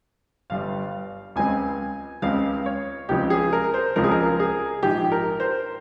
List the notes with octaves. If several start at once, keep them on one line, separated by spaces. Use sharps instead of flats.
G1 G2 G3 F5
C#2 C#3 G#3 C4 G#5
C#2 C#3 G#3 C4 F5
C#5
C#2 C#3 F3 G#3 C4 G4
G#4
A#4
C5
C#2 C#3 F3 G#3 C4 A#4
G#4
A#4
G#4
A#1 G#2 F3 G4
A#4
C5